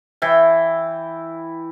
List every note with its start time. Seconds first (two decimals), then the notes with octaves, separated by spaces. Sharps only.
0.22 E3 E4 G5